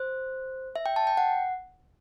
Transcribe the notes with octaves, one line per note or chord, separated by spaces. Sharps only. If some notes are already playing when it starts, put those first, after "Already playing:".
Already playing: C5
E5
G5
A5
G5
F#5